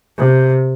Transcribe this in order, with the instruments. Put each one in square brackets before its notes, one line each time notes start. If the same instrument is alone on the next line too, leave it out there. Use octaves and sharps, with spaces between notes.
[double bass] C3